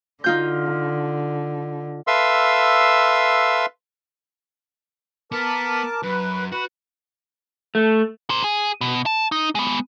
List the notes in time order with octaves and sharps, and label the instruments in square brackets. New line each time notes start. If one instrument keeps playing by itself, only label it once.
[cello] D3 [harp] D#4 F4 G6
[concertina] A4 B4 E5 F5 C6 E6
[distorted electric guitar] B3 [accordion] A#4 A5 D6
[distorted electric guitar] F#2 [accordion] B4
[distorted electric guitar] F#4 [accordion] B4
[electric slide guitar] A3
[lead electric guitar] A#4 C5
G#4
B2
A5
D#4
G#3 B3